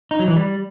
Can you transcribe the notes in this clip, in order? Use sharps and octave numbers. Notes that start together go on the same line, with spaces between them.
D#4
F#3
E3
G3